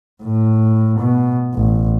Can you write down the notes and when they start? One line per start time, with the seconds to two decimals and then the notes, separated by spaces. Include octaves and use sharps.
0.23 A2
1.00 B2
1.55 A1